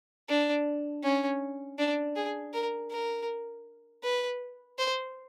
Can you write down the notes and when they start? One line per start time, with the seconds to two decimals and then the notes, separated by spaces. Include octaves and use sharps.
0.28 D4
1.03 C#4
1.78 D4
2.16 G#4
2.53 A#4
2.91 A#4
4.03 B4
4.78 C5